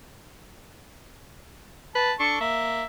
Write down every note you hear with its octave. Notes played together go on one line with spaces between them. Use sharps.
B4 A5
D4 A4 C#6
A#3 E5